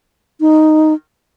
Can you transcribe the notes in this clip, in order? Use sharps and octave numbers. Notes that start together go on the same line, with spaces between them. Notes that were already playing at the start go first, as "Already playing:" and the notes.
D#4